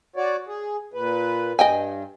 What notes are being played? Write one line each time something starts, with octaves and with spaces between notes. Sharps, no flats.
F#4 C#5 D5
G#4
A#2 B4
G2 D#5 G5 G#5